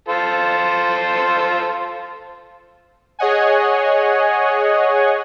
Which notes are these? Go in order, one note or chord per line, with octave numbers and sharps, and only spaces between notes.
F4 A4 C5
G#4 C#5 D#5 F#5 G#5